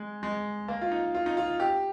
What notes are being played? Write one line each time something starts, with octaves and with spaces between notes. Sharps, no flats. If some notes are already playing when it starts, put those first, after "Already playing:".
Already playing: G#3
G#3
A#3
F4
D#4
F4
D#4
F4
G4